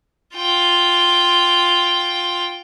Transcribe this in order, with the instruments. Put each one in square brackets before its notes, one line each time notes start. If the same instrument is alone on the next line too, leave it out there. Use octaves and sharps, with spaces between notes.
[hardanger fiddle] F4 G5